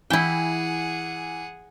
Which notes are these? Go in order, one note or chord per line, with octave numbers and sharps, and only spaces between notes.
E3 E4 G#4 F#5 G5